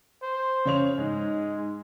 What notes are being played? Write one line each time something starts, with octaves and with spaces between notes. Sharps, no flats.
C5
C#3 C#5 F7
G#2 G#3